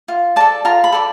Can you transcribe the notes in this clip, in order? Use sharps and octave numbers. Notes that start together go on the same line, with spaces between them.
F4
A4 D5 A5
F4 A#5
B5
A4 D5